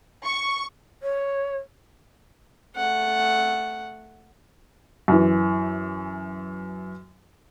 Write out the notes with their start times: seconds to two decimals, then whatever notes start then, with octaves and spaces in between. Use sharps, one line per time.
0.25 C#6
1.02 C#5
2.76 A3 F#5
5.08 F#2 E3